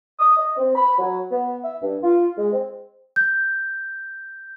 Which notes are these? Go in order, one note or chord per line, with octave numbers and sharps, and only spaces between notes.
D#6
D#5
C4
B5
F#3
B3
E5
G2
F4
G#3
C4
G6